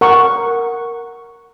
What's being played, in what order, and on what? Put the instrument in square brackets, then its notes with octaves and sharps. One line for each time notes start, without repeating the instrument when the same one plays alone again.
[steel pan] A#4 F#5 C#6